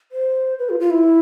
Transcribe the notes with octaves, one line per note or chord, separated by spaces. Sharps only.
C5
B4
F4
F4
E4